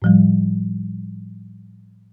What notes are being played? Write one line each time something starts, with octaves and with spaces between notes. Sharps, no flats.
A2 F3 G3